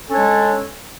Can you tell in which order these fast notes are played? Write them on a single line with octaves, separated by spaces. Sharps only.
A4 C#4 D4 C#5 G#3